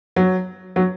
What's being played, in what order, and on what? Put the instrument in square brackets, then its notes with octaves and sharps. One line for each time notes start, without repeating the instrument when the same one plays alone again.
[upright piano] F#3
F#3